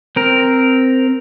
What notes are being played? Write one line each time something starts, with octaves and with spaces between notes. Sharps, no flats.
C4 A#4